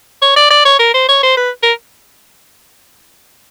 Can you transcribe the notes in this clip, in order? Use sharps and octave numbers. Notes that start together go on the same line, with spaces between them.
C#5
D5
D5
C#5
A#4
C5
C#5
C5
B4
A#4